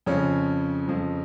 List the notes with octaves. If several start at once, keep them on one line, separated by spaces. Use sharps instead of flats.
F2 C#3 F3 C#4
F2 F3